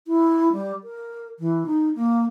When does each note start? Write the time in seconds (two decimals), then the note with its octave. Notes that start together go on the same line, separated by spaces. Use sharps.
0.07 E4
0.52 G3
0.84 A#4
1.39 E3
1.66 D#4
1.95 A#3